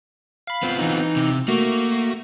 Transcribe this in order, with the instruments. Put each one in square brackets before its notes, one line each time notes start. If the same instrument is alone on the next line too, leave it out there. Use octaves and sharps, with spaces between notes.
[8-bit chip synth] F5 B5
[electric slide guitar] B3 C4 F4
[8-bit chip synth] E3 D#4
[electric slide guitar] C3
[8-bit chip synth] A3 F#4 [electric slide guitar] A#3